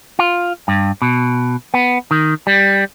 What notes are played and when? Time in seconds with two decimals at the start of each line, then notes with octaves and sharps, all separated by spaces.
0.19 F4
0.68 G2
1.02 B2
1.74 B3
2.11 D#3
2.47 G3